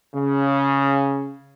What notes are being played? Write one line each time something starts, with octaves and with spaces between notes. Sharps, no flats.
C#3